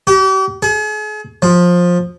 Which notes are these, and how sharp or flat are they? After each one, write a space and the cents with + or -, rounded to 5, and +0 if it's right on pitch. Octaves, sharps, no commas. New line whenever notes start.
G4 -40
G#4 +40
F3 +15